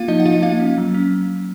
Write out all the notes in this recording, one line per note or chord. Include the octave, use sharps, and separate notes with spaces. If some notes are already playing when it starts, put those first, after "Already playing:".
Already playing: A#3 F4 F5
F3 D#4 D#5
F#5
F3 F4 F5
A#3 F4 F5
C#4
F#3
C#4